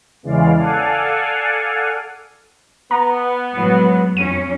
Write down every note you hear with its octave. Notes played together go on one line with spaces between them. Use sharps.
E2 C#3 E3 G#3 D5 F5
A4 D5 F5 F#5 G#5
B3 A#5
A2 F#3 G#3
F2 C#4 D#7